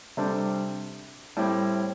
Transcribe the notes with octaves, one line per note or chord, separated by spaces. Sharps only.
C3 G3 D4 A4
A2 G3 C4 E4